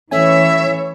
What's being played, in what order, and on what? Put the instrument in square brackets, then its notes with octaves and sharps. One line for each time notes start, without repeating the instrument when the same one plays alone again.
[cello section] E3 C#5 [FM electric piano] A3 C#4 G#5 [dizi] E5